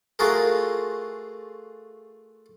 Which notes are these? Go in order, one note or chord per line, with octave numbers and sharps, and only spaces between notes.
A3 F4 F#4 G#4 A#4